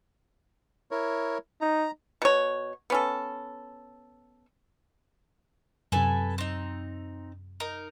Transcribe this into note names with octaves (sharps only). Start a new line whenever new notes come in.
E4 A#4 C#5
D#4 A#5
B2 C#5
B3 C#4 A4
F#2 C3 A4 B4 G#5
C4 D#4
D#4 A#4